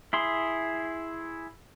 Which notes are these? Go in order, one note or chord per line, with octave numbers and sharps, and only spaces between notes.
E4 G#4 C6